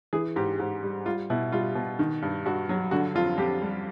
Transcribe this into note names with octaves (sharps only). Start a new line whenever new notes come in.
E3 G#4
G#2 G4
G#2
G3
G3 F4
B2 E4
G3 F4
B2
D#3
G2
G2 F#4
F#3
D3 F#4
F2 F4
F2 G4
G3